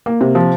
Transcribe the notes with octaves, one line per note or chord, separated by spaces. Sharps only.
A#3
C3
F3